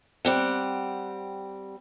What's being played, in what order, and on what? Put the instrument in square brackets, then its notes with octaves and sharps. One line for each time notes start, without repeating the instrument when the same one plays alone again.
[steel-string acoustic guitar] G3 C4 F#5